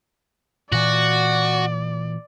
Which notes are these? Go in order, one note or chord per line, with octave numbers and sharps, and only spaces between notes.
A#2 E3 F#4 D5